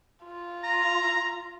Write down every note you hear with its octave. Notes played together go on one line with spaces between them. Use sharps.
F4
A#5